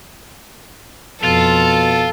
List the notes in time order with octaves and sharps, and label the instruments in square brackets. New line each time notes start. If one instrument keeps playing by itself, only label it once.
[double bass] F2 [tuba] B2 [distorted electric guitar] F4 [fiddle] A4